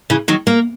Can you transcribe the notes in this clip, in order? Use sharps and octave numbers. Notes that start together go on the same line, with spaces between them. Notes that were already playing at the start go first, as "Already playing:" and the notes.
C#3 E3
D#3 F#3
A#3